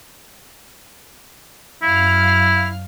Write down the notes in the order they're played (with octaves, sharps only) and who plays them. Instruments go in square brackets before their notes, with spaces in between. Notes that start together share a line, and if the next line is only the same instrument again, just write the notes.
[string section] F#2 F5 F6 [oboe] E4